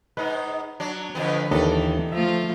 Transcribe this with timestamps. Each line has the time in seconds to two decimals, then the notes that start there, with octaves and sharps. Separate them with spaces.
0.17 G#2 D#4 B4
0.80 F#3 D4
1.15 F2 D3 F3 B3 B4
1.51 D#2 D#3 E3 D4 A4 D#5
2.12 F3 A3 F4 E5